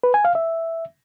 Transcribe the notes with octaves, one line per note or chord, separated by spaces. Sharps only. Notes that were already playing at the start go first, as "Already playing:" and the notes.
B4
G#5
F5
E5